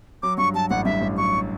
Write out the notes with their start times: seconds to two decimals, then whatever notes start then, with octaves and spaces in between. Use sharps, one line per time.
0.23 F#3 D6
0.38 G2 C#6
0.54 F#3 A5
0.70 A1 F#5
0.85 G2 E5
1.02 A1
1.17 F#3 C#6